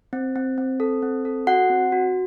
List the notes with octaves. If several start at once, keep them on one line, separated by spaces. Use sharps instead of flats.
C4
C4
C4
A4
C4
A4
F#4 F#5
C4
F#4